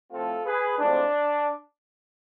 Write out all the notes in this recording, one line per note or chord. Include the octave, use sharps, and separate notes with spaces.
A2 F3 A3 C4 F4 A4
G#4 B4
A2 F3 G#3 C4 D4